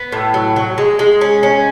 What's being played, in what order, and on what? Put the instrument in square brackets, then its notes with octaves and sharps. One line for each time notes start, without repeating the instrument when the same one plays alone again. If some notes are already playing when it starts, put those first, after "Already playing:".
Already playing: [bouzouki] B3
A2
F#3
F#3
G#3
G#3
C#4
C#4